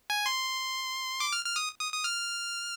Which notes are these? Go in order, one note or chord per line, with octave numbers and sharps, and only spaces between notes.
G#5
C6
D6
F6
F6
D#6
D#6
D#6
F6